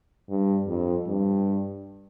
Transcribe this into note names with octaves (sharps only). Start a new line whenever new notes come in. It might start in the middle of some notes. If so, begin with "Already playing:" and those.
G2
F2
G2